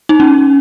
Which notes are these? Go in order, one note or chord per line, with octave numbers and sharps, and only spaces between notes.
D#4
C#4